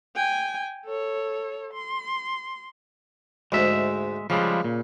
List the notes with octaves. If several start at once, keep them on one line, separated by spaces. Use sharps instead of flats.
G5 G#5
A4 C#5
C6
D2 G#2 G#3 E5
C#3 F3 G3 G#3
A#2